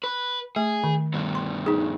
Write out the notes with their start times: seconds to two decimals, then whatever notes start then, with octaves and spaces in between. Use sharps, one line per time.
0.04 B4
0.56 A3 G#4
0.84 D#3
1.14 G2 B2
1.35 C6
1.66 D#4 G#4